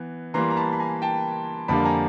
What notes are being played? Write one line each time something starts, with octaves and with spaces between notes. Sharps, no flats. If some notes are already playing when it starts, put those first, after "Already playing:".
Already playing: E3 B3
E3 G3 A#3 A#5 C6
A#5
A5 B5
B5
G#5 A#5
G5 A5
F2 D3 G3 A#3 A5 B5
G#5 A#5